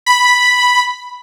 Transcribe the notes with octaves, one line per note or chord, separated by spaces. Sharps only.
B5